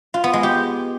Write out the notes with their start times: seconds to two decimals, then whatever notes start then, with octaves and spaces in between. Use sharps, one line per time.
0.14 F4
0.24 B3
0.33 G#3
0.43 G4